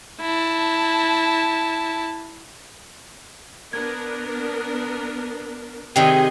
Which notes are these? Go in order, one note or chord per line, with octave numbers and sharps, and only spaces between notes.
E4 A5
B3 D4 A#4 G#6
C3 D#3 G#4 D#5 G5 G#5